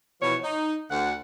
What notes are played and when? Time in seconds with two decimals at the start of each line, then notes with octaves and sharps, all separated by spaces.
0.21 B2 E3 F3 C#5
0.43 D#4
0.91 D2 F#5